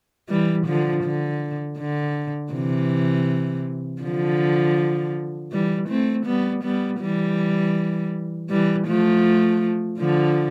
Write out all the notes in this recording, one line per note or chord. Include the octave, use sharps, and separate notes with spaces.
E3 G3
D3 F3
D3
D3
C3 E3
D3 F3
E3 G3
A3 C4
G3 B3
G3 B3
E3 G3
E3 G3
F3 A3
D3 F3